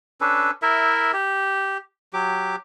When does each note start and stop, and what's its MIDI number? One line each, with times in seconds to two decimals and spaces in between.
0.21 0.51 61
0.21 0.51 62
0.21 0.51 69
0.21 0.51 71
0.62 1.12 64
0.62 1.12 70
0.62 1.12 76
1.13 1.77 67
2.13 2.56 54
2.13 2.56 67
2.13 2.56 86